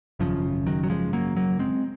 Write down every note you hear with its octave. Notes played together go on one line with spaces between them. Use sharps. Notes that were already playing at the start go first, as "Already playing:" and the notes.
G#1 F#2 C#3 F3
D#3 F#3
F#3
F3 G#3
F#3 A#3
F#3 A#3
G#3 C4